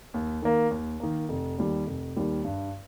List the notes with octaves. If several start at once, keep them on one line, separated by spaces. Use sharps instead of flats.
D#2
D#3 A#3
D#2
D#3 A#3
F1
D#2 D#3 G3
F1
D#2 D#3 G3
G2